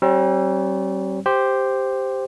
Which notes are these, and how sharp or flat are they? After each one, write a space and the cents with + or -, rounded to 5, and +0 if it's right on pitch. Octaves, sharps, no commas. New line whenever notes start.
G3 -40 C4 +40
G4 +0 C5 +0